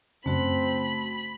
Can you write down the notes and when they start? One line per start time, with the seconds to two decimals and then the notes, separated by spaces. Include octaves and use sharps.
0.26 F#2 C#3 A3 C4 F#4 B5